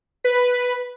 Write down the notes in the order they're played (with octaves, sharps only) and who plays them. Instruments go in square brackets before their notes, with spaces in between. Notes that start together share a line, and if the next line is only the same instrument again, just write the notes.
[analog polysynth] B4 B6